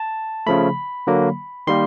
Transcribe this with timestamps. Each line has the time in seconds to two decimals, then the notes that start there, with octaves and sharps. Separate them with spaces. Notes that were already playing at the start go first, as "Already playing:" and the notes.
Already playing: A5
0.47 C#3 F3 A3 B5
1.07 D3 F#3 A#3
1.67 D#3 G3 A#3 C6